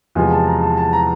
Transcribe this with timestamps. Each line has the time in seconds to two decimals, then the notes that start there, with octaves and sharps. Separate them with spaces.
0.15 E2 C3 F3 G#3 G#5
0.31 A5
0.47 A#5
0.62 A5
0.77 A5
0.93 A#5